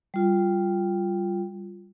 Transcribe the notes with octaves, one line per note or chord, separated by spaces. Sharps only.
G3 F4